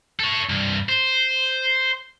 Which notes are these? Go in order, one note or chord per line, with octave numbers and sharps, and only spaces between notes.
A4 C#5
C2 G2
C5